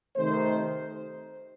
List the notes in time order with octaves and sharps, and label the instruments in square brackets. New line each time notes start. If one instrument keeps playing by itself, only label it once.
[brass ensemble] C3 D#3 A3 C5